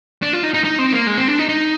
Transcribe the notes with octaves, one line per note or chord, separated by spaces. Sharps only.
D4
F4
D#4
D#4
D#4
C4
A#3
G#3
C4
D4
D#4
D#4